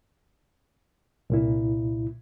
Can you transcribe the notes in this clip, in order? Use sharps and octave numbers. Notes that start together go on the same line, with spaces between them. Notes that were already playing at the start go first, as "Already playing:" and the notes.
C2 A#2 E4